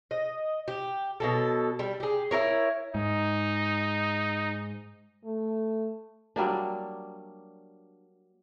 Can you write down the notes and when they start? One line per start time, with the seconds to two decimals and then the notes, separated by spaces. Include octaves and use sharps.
0.11 D#5
0.68 G4
1.20 B2 F#3 A4
1.79 G3
2.00 G4 G#4
2.31 E4 F4 A#4 C#5
2.95 G#2 D#4
5.25 A3
6.36 F#3 G3 A#3 D4